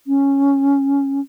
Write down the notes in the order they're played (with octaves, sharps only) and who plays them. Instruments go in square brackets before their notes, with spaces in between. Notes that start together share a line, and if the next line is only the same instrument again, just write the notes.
[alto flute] C#4